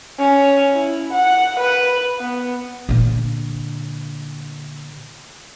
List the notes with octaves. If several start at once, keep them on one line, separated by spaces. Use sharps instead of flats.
C#4
E4
F#5
B4
B3
A#2 D3